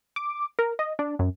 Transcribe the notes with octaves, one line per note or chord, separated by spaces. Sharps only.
D6
A#4
D#5
D4
F#2